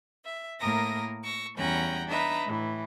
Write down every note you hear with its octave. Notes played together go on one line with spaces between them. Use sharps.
E5
A2 A#3 A#4 A#5 D#6 A#6
C#6 E6 A#6
E2 G3 C#4 F#5 G5 A#5
D4 D#4 B4 E5 A#5
A2 E3